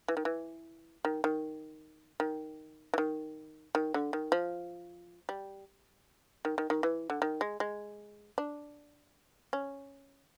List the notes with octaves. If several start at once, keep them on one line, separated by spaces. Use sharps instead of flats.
E3
D#3
E3
D#3
D#3
D#3
E3
D#3
D#3
D3
D#3
F3
G3
D#3
D#3
D#3
E3
D3
D#3
G#3
G#3
D4
C#4